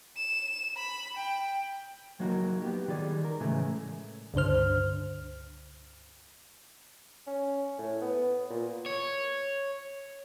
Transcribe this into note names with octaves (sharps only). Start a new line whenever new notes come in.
E7
B5
G5
F#3 A#3 D#4 F#4 A4 A#4
B3 G4
D#3 G3 G#4 D5
A#4
A2 C#3 E3 G#3 A3
C#2 G2 D3 C5 F6
C#4
A2
B3
A#2
C#5